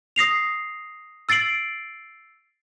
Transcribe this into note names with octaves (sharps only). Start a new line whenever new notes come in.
D#6 A#6 C7 F7
E6 A6 C7 D7 F#7